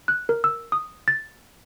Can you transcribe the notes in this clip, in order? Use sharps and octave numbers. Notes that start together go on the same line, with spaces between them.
F#6
A#4
E6
D#6
A6